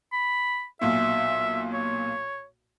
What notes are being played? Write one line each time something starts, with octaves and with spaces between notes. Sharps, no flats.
B5
B1 A#2 E5
C#5